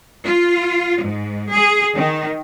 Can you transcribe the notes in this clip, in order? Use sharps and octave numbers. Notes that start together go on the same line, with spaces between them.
F4
G#2
G#4
D#3